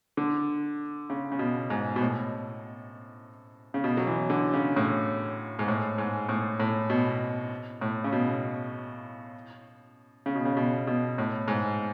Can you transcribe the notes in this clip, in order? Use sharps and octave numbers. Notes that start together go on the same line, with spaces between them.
D3
C#3
C#3
B2
G#2
B2
A2
C#3
B2
F#3
E3
D3
C#3
A2
G#2
A2
G#2
A2
A2
B2
A2
C#3
B2
C#3
B2
C#3
B2
B2
A2
G#2